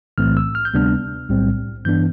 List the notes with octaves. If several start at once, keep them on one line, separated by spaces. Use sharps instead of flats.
B1 A2 E3 A3 C4 F6
E6
F6
G6
D2 C3 G3 B3 D4 F6
B1 A2 G3 C4
G2 E3 B3 D4 G6